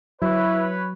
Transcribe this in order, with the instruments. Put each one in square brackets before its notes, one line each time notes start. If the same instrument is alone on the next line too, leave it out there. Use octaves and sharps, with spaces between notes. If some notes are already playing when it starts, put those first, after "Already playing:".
[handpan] F#3 [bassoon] E4 [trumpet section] B4 C#5